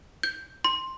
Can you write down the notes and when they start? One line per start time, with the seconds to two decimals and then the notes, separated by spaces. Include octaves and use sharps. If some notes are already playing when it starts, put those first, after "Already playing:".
0.23 G6
0.64 C6